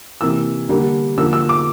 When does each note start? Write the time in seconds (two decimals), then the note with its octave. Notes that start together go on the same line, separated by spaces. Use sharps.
0.21 C3 E3 A#3 E6
0.69 D3 G3 A#3
1.17 D3 F3 A#3 E6
1.33 E6
1.49 D6